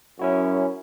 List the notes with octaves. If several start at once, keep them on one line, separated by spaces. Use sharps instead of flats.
F#2 C#4 E4 F#4